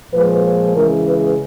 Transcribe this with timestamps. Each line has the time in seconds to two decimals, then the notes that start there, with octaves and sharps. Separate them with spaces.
0.13 A#2 F3 G#3 B4
0.44 B4
0.75 C#3 E3 G#3 A#4
1.06 B4